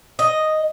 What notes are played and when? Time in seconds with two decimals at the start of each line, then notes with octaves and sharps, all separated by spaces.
0.19 D#5